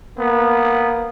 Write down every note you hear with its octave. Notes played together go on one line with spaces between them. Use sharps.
A#3 B3